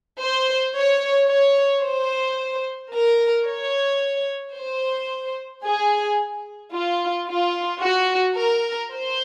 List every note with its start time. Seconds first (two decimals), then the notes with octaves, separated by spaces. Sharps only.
0.21 C5
0.76 C#5
1.29 C#5
1.84 C5
2.93 A#4
3.48 C#5
4.57 C5
5.64 G#4
6.74 F4
7.28 F4
7.82 F#4
8.37 A#4
8.92 C5